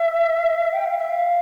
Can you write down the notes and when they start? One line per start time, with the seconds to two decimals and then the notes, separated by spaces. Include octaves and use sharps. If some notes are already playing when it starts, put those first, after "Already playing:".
Already playing: E5
0.72 G5
0.86 F5
0.98 E5
1.10 F5